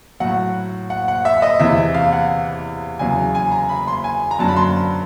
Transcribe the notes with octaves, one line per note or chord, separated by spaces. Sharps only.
A2 F#3 F#5
F#5
F#5
E5
D#5
E2 C3 E3 E5
F5
F#5
E2 C#3 F#3 G#5
G#5
A#5
B5
C6
G#5
A#5
F#2 D3 F#3 A5
B5
C6